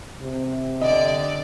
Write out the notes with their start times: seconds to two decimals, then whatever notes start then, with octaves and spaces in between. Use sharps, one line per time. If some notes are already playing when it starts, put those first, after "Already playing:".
0.22 C3
0.81 D3 D5 D#5